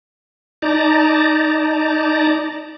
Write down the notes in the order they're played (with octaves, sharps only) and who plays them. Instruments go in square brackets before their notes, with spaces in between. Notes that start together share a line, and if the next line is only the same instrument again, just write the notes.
[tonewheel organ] D#4 D5 A5 A#5